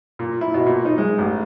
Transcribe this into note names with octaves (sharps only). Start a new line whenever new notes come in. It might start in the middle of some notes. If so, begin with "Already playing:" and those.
A#2
E4
B2
A#2
D#4
G#3
A1